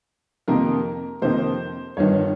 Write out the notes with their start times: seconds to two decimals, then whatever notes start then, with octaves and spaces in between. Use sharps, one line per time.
0.48 F2 C3 D#3 A#3 A#4
1.22 F2 C3 D#3 A#3 C5
1.97 G1 G2 D#3 C#5